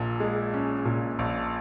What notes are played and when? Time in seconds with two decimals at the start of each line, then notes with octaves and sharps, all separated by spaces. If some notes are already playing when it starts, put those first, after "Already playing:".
Already playing: A#1 A#2
0.20 G#3
0.54 C#4
0.85 A#2
1.19 A#1